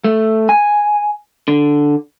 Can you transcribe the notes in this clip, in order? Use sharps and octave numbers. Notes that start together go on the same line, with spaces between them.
A3
G#5
D3